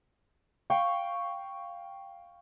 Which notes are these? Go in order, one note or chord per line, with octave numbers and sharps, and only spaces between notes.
F5 G5 C#6